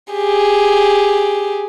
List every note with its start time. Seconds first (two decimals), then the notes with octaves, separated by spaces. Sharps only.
0.13 G4 G#4